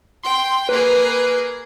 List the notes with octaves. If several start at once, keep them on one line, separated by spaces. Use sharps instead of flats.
G5 C6
A#3 G#4 B4